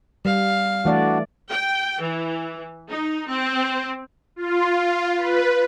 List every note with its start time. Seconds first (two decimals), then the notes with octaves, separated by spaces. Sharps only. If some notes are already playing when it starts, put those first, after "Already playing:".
0.25 G3 F5
0.85 E3 A3 D4 F#4 D5
1.50 G5
2.02 E3
2.89 D#4
3.29 C4
4.36 F4
5.16 B4